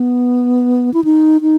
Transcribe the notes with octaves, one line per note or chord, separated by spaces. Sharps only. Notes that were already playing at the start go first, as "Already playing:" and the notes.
Already playing: B3
E4
D#4
D#4